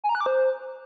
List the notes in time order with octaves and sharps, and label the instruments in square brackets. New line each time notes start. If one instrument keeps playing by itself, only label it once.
[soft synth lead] G#5
A#5
F#6
D6
C5